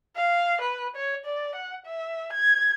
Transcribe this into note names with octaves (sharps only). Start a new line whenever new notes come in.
F5
B4
C#5
D5
F#5
E5
G#6